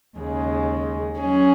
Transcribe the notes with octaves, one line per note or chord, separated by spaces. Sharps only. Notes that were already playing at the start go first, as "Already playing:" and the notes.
D#2 C#3 G#3
F#3 C#4 G#4